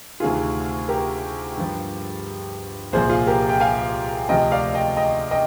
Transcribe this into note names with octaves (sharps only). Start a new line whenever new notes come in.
D2 C3 D#3 F4 G#4
G4 A#4
G2 F3
C2 A#2 F3 G#4 C5
F4 G#4
G4 A#4
G5
F5 G#5
D2 C3 F3 D#5 G5
D5 F5
D#5 G5
D#5 G5
D#5 G5